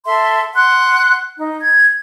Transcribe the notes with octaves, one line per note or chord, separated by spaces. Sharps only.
A4 E5 C6
F#5 C6 F#6
D#4
G#6